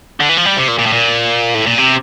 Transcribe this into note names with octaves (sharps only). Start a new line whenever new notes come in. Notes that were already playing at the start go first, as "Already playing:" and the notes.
D3
E3
F3
G3
C3
A#2
A#2
A2
A#2
A2
A#2
C3